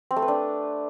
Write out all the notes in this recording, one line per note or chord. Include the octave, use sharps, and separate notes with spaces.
C4
A3
B4
D4